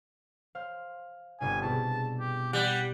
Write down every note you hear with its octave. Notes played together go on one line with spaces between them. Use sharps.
C5 F5
G1 C3 G#5
B2 E4 G#4 A5
G4
G3 F#5